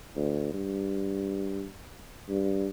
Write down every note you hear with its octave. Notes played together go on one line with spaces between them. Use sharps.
D2
G2
G2